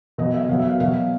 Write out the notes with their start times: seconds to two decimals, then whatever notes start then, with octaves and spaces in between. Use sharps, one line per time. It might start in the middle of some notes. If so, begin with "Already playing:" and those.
0.18 B2 F#3 D#5
0.34 E5
0.49 B2 F#3 F5
0.60 E5
0.70 F5
0.80 B2 F#3 F5